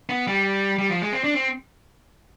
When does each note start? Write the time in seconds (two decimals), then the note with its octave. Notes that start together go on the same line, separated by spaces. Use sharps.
0.09 B3
0.27 G3
0.79 G3
0.89 F3
1.02 G#3
1.13 C4
1.24 D4
1.35 C4